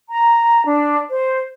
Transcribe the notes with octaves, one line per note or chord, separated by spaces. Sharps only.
A#5
D4
C5